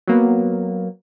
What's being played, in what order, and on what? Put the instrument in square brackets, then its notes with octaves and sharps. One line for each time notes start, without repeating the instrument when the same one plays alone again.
[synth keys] F#3 A#3 B3